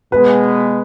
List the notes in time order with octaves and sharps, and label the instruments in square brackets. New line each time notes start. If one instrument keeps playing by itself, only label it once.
[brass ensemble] B2 G#3 B3 [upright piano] B4